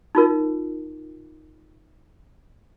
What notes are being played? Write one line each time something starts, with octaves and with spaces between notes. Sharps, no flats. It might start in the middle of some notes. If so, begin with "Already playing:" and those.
D#4 F4 A#4